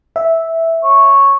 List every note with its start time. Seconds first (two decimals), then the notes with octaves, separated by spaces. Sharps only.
0.16 E5
0.84 C#5